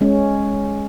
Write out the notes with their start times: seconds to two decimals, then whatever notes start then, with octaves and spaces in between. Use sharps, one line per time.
0.01 G#3 C#4